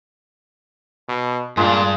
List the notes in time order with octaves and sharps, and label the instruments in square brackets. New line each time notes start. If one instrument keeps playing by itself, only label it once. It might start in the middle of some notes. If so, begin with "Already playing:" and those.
[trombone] B2
[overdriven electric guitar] G2 D4 [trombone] A#2 [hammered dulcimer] G#3 F4